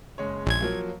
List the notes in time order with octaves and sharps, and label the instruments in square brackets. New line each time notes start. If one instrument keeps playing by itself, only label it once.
[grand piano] F#1 G#3 C#5
[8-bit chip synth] A#1 G#6
[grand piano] F3 F#3 A#3